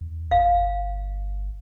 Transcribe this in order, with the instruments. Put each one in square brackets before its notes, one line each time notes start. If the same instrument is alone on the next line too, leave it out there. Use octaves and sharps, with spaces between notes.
[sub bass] E2
[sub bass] G1 [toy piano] F5